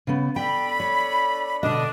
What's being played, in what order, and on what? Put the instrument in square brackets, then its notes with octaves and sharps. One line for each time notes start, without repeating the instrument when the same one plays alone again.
[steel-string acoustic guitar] C#3 B3
[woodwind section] D4 A4 B5 [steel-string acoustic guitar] G5
[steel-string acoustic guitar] C#5
[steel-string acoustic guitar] B2 D#5 [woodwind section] D3 D4